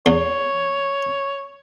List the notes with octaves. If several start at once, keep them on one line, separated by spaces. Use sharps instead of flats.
E2 C#5